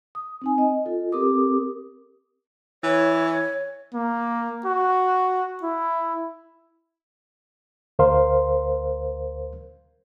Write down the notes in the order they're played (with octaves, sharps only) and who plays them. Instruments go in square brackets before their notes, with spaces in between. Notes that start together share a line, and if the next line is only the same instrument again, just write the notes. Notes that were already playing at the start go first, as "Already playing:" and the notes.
[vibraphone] D#6
C4 D#4 G#5
D#5
F4 A4
C4 G4 A4 A#4 D6 D#6
[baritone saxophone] E3 [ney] C#5
[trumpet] A#3
F#4
E4
[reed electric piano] D2 A#4 C5 F5 C6